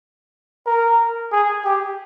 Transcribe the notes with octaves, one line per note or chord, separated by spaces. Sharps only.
A#4
G#4
G4